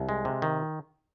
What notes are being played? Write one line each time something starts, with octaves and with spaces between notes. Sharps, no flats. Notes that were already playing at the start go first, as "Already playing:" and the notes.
Already playing: C2
G#3
C3
D#3